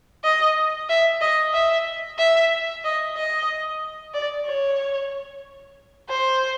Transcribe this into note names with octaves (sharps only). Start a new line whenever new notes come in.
D#5
E5
D#5
E5
E5
D#5
D#5
D5
C#5
C5